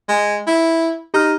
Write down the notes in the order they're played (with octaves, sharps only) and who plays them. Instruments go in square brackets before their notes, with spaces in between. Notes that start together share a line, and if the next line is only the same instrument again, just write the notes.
[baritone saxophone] G#3
E4
[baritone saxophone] D#4 [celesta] G4 F6